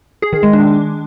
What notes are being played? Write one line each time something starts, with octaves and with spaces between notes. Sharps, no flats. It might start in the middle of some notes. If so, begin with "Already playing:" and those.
G#4
D#3
G#3
D4